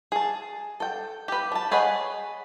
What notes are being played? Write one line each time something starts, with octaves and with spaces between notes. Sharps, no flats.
G#4 A5
A4 G5
G4 B4
D4 A5
G#4 B4 C#5 D#5 F#5